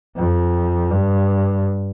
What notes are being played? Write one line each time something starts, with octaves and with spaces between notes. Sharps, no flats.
F2
G2